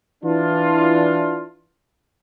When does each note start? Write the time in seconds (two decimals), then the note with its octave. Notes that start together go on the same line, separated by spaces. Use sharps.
0.23 E3 D4 F4